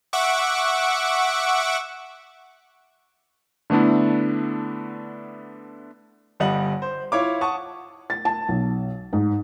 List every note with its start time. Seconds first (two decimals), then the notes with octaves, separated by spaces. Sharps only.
0.13 E5 F#5 C#6 D6
3.70 D3 A3 B3 D4 E4
6.40 G1 G3 D#5 F#5 F#7
6.82 C5
7.12 E4 F4 C#5 F5 D6
7.41 F#5 A5 C#6 D#6
8.10 A6
8.25 A5
8.48 B1
9.13 G#2